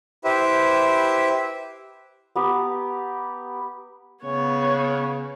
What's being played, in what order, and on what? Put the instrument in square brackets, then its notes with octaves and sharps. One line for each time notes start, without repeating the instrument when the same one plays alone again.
[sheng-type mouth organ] E4 G4 B4 C5 E5
[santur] B3 G4 A#5
[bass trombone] C#3 [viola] B3 C#5